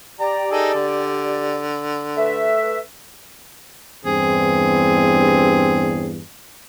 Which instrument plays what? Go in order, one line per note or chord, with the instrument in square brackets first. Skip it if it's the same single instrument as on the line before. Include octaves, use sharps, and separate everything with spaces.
[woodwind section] G4 D5 [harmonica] A#5
[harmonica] D#4 G#4 A4
D3
[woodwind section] A3 B4 E5
[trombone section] E2 G2 [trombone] C4 [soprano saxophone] G#4